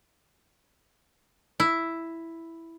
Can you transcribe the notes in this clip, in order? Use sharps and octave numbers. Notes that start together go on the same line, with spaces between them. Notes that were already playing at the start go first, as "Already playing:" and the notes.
E4